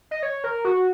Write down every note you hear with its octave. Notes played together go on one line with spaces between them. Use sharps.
D#5
C#5
A#4
F#4